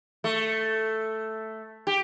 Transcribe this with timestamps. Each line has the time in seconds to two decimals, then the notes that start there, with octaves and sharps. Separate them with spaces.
0.24 A3
1.87 G4